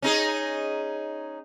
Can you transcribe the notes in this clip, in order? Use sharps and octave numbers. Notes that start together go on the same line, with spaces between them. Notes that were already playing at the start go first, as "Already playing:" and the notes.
C#4 D#4 G#4